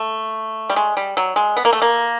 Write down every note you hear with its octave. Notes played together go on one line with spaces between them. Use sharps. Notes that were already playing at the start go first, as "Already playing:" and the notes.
Already playing: A3
G3
G#3
G3
F#3
G#3
B3
A#3
A3
A#3